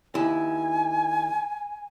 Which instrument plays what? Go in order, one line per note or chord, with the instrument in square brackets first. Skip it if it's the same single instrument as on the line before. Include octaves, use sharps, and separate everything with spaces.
[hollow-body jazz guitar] D#2 E4 [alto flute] G#5